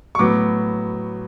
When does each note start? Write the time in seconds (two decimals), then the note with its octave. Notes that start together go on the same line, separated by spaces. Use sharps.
0.15 C#6
0.19 A2 F#3 B3 D6